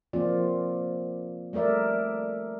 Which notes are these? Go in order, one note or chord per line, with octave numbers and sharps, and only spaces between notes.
F3 A#3 C4 F4 D5
G3 A3 A#4 D5 E5